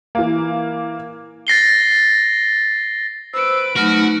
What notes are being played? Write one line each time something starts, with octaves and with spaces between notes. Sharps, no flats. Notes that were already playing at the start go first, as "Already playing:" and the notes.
E3 A#3
A6 A#6 C7 G7
B4 C5 E6 D7
F#3 A3 D#4 F#4 F6